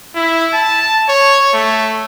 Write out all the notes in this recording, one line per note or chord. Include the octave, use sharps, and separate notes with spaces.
E4
A5
C#5
A3